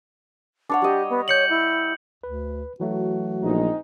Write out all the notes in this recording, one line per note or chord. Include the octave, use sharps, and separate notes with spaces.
D4 C#5 F#5
G3 G4 D#5
B3
C#5 G6 C#7 F#7
E4
D2 B4
E3 F#3 A3 F#4
A#1 G#3 C4 D#4